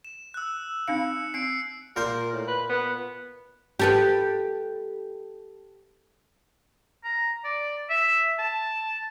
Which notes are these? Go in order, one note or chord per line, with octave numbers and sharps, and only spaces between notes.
E7
E6 F#6
C4 D#4 F5 C#7
C4 C7 D7
A#2 A#4 C5
A2
B4
B3
G4 A4 B4
A#5
D5
E5
A5